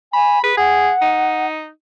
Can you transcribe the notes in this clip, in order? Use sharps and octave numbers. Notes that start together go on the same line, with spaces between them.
G#5 B5
G#4 B4
G#4 F#5
D#4